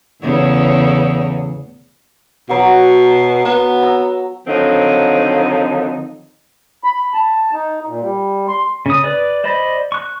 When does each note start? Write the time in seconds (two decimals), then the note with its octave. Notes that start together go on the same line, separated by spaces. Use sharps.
0.22 E2 A2 C#3
2.49 B2 F#3 B4 F#5
3.45 B3
3.81 A#5 E6
4.47 D3 D#3 F3 F#3 C4 D#4
6.84 B5
7.14 A5
7.53 D#4
7.87 A#2
8.02 G3
8.48 C6
8.86 C#3 D#6
9.04 B4 D5
9.44 C5 D5 D#5 B5
9.92 C#6 F#6